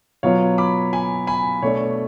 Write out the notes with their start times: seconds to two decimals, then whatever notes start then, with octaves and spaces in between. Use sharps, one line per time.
0.23 B2 F#3 B3 F4 C#5 F5
0.58 B5 D6
0.93 G#5 B5
1.27 G#5 B5
1.62 B2 A3 D4 C#5